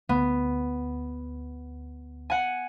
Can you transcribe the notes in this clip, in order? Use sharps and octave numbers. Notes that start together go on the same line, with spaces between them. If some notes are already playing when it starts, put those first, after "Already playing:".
D2 B3
F#5 G#5